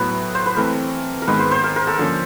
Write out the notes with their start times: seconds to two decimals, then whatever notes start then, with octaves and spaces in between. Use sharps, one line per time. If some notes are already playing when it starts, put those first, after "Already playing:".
Already playing: A2 F#3 B3 B4
0.35 C5
0.46 B4
0.56 E3 A3 C4 A#4
1.22 A#4
1.27 G#2 D#3 G#3 B3 B4
1.39 C5
1.51 C5
1.64 A#4
1.76 A#4
1.87 A4
1.99 D3 F3 A#3 C#4